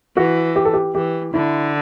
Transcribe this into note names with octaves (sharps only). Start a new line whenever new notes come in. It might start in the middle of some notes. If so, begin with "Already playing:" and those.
E3 F#4
G4
A4
G4
E3 G4
D3 E4